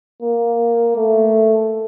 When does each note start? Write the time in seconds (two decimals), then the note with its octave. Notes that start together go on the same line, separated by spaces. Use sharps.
0.22 A#3
0.96 A3